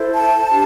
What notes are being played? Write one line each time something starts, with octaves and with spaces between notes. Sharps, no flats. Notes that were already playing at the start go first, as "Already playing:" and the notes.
Already playing: E4 A4 C5
A5
D4 G4